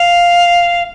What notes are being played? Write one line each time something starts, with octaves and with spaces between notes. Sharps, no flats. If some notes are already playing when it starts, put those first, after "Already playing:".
Already playing: F5